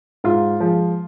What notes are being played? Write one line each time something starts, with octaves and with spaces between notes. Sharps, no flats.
G#2 F4
F3 G#3